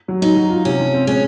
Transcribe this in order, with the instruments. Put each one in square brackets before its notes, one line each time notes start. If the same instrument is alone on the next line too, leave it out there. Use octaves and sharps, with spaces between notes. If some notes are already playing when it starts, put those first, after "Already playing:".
[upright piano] F#3
[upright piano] F#3 [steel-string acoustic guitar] D#4
[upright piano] F#3
F4
[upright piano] C3 [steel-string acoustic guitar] C#4
[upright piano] F3
C4
[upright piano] G#3 [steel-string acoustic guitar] C#4